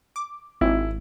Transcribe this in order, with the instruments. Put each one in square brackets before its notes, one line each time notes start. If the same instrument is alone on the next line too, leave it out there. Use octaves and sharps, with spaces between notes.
[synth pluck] D6
[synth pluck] G#1 [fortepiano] E4